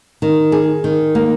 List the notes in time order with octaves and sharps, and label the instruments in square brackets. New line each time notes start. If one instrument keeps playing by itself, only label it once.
[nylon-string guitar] D#3
G#4
D#3
A#3